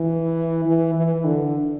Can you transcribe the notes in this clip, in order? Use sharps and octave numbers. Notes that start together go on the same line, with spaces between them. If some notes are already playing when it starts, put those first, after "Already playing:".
Already playing: E3
E3
E3
D3